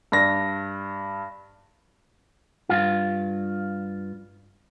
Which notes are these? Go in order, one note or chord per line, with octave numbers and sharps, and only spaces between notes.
G2 A#6
G2 F4